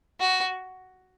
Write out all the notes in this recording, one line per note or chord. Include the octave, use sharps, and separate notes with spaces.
F#4